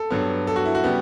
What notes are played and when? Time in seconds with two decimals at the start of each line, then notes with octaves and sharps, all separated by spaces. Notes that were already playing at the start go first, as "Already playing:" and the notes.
Already playing: A4
0.10 G2 F#3 B3
0.47 A4
0.56 F#4
0.65 E4
0.75 F#4
0.84 C#3 G3 B3